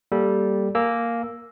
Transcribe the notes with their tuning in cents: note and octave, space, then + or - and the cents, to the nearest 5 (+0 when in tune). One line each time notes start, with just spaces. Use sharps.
G3 -5 A#3 +0 A4 -10
A#3 +0 G#5 +20 E6 +0